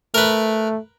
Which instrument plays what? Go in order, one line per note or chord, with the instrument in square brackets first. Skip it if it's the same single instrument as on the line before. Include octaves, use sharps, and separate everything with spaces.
[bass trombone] A3 [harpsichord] A#4 B4